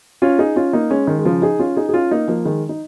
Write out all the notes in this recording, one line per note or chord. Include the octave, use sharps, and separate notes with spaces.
C#4 F4
D#4 G#4
C#4 F4
A#3 D#4
G#3 C#4
D#3 G#3
G#3
C#3 F3
D#4 G#4
C#4 F4
D#4 G#4
G#4
C#4 F4
A#3 D#4
F3 A#3
D#3 G#3
D#4